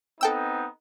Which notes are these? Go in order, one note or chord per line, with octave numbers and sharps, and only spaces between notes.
B3 C4 D#4 A4 G5 E6